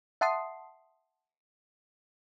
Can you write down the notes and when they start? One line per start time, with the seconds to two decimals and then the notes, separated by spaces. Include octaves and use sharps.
0.21 E5 F#5 A5 C6 D#6 C7